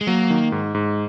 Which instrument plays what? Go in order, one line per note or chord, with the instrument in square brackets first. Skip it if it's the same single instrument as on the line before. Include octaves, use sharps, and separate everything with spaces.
[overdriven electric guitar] G#3
[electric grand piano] F#3 [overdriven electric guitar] A#3
[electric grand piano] D#3
G#2
G#2